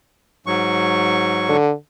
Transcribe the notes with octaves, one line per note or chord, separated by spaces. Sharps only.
G#2 F#3 C#6
D3